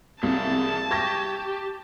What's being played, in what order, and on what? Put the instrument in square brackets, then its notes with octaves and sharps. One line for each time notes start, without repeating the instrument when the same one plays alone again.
[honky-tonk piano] C2 [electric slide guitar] G#4 E5 F5 [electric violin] A5
[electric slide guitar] G4 [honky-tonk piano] C#6 G#6 A#6